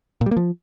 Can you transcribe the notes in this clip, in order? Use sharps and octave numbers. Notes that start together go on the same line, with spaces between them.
A#2
G3
A#3
F3